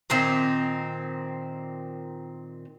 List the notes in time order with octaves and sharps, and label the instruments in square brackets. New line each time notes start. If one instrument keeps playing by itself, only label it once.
[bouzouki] A#2 D#3 C4